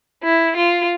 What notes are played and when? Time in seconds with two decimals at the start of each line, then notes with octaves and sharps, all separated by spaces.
0.24 E4
0.56 F4